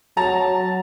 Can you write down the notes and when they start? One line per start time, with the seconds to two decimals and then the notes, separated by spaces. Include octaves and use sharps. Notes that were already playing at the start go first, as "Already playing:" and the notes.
0.17 F#3 A5 A#5